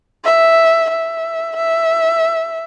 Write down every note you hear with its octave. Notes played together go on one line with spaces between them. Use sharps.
E5
E5
E5